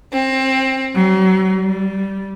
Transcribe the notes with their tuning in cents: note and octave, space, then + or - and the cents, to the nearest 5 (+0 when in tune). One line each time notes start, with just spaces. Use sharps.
C4 +20
F#3 +40
G3 -10